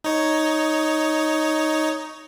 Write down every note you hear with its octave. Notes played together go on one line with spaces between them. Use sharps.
D#4 C#5